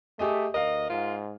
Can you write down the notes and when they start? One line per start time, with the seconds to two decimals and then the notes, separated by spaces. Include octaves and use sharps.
0.19 A3 G4 G#4 D#5
0.54 D2 A#4 D#5 F5
0.90 G#2 F4